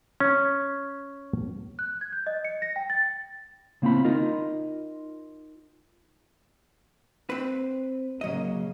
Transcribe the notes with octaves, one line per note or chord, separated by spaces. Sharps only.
C#4
F#6
G#6
G6
D#5
C#7
A#6
G5
A6
C#3 A#3 C4 E4 B5
D#4 F4 A#4 D#5
C4 B4
C#3 F#3 A#3 D#5